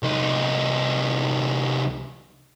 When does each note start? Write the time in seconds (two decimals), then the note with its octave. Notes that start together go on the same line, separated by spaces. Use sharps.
0.03 C2 D#4